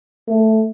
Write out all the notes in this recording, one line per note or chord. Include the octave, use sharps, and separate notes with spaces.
A3